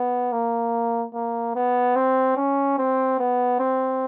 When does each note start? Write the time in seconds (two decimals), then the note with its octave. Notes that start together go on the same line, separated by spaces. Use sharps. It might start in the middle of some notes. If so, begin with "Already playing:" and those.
Already playing: B3
0.32 A#3
1.14 A#3
1.55 B3
1.96 C4
2.37 C#4
2.78 C4
3.19 B3
3.60 C4